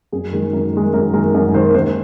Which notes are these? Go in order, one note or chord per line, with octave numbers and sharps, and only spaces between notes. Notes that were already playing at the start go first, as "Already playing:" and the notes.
F#2 G#4
D#3 G#3
F#2 A#4
D#3 G#3
F#2 A#4
D#3 G#3 A#4
F#2 A#4
D#3 G#3 C5
D#2 C5